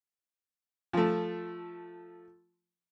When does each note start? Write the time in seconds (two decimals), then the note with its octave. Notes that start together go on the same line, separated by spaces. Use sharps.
0.93 F3 A3